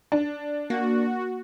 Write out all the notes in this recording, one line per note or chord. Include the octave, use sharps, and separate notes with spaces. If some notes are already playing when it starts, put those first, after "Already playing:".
D4
A#3 F#4